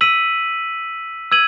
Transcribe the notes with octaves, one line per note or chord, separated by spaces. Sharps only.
E6 B6 D#7 F#7
E6 G#6 D#7 F#7